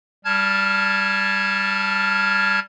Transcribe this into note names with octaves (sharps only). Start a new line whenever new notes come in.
G3 A5 F6 G#6